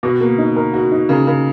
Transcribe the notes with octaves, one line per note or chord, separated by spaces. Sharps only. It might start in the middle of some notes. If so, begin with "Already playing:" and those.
B2 F#4
A#3
D#4
A#4
F#4
D#4
C#3 A#4
C#3 A#4